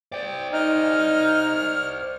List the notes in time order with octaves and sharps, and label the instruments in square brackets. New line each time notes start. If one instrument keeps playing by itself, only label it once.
[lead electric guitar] C5 D5 [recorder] G5
[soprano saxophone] D#4 [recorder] F6